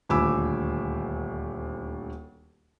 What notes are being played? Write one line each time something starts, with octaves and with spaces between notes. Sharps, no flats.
D#1 D2 G#5 B5 D6 E6